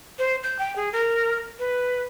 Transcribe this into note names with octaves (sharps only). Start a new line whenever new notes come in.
C5
G6
G5
G#4
A#4
B4